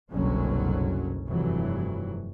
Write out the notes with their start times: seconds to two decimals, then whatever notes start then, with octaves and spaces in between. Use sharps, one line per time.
0.12 F#1 C2 B2 D3 F#3 C#4
1.28 F1 G2 E3 F#3